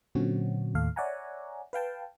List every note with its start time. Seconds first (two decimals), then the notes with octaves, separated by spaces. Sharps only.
0.15 A#2 D3 F#3 C4 C#4 F#4
0.75 D#2 A2 A4 F5
0.96 C#5 D5 E5 F#5 G#5 A#5
1.73 B4 F5 G5 A5